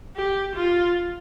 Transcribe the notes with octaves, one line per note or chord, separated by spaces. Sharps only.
G4
F4